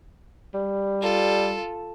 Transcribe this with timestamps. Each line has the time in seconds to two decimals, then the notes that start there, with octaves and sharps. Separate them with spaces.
0.54 G3
1.02 F4 A4